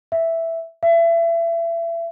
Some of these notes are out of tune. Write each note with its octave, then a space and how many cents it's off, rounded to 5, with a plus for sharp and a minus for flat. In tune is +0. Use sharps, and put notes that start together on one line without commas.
E5 +0
E5 +30